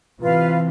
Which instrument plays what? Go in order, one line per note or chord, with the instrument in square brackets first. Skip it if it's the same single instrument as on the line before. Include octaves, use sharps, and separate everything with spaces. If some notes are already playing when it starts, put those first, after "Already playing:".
[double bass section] C3 E3 [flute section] F4 B4 F5